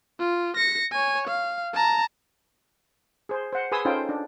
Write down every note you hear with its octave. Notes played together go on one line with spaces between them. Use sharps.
F4
A#6 C#7
C#5 G#5
F5
A5 A#5
G#4 C5
C5 F#5
G#4 B4 G#5 C6 D#6 E6
C#4 D#4 F4 A4 C5 G5
D4